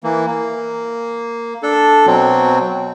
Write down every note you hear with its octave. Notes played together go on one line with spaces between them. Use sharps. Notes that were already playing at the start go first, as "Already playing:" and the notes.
E3 A#3
A#3
D4 A4
B2 F#3 C4